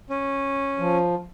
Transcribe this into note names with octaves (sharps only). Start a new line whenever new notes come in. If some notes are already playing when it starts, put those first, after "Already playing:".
C#4
F3